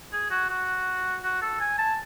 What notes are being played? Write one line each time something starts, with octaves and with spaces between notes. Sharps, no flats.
G#4
F#4
F#4
F#4
A4
G#5
A5